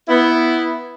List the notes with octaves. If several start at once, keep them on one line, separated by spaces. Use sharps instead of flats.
B3 E4